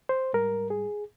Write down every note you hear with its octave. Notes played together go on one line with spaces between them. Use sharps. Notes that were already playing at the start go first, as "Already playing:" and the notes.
C5
G#2 G3 A#4
G#4